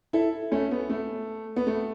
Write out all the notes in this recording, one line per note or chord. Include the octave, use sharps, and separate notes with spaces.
E4 A4
A3 C#4
B3
A3
B3
A3